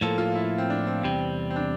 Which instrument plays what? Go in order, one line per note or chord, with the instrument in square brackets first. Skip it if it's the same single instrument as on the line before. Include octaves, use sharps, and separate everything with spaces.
[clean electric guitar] A2 F3 A#3 [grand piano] A4
[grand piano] F4
E4
C4
D4
C4
[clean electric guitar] E2 C3 G3 [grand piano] C4
[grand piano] C4
D4